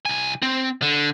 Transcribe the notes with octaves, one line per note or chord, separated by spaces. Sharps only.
C2 G#5
C4
D3